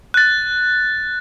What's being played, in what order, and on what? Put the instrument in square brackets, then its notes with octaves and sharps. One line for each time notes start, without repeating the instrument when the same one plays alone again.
[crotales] F#6 A6